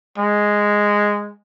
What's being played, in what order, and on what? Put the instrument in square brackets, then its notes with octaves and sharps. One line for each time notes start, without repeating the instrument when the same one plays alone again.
[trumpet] G#3